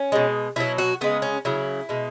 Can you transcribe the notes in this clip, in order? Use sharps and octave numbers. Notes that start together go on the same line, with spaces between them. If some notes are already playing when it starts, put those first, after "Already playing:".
Already playing: C#4
B2 G#3
B2 F#3 E4
F#4
C#3 G#3 B3
C#4
C#3 F#3 E4
B2 G#3